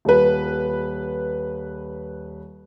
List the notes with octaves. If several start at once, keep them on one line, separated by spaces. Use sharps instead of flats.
D#1 B4